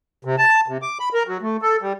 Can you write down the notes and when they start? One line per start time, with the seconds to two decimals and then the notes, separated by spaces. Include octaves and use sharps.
0.25 C3
0.38 A5
0.68 C3
0.82 D6
1.00 B5
1.14 A#4
1.27 F#3
1.42 A3
1.62 A4
1.82 G3